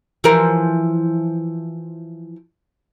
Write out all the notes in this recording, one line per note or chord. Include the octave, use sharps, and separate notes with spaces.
E3 F3 A#4